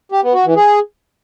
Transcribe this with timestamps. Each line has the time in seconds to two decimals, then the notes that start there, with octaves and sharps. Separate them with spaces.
0.12 G4
0.23 B3
0.34 F#4
0.45 E3
0.56 G#4